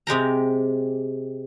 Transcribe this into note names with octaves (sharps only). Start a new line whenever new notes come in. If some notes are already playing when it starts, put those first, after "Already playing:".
C3 G#3 G4 A#5